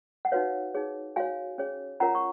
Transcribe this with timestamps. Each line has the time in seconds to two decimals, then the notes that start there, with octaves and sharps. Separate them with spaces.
0.25 F#5
0.32 D#4 F#4 B4 C#5 F5
0.75 D#4 G#4 C#5
1.16 F#4 C#5 F5 G#5
1.58 C#4 G#4 C#5
2.00 C#4 F4 A#4 C#5 F#5 A#5
2.15 C#6